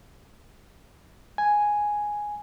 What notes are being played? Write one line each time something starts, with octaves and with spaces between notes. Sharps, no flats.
G#5